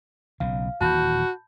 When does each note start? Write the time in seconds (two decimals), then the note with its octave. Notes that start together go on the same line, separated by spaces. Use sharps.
0.40 B1 C#3 F5
0.81 D#1 A#2 E3 F#4 A5 B5 G6